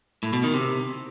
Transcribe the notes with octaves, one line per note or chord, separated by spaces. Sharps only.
A2
B2
D#3
C3